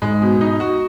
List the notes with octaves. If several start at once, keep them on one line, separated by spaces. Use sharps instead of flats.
G#2 G#3
B2
D#4
F#4